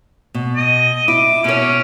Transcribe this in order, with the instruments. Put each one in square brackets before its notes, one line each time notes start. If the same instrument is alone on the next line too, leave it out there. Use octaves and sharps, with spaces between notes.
[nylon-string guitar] B2
[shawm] D#5
[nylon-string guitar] E4 [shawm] D6
[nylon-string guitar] B2 C#5 [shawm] C#4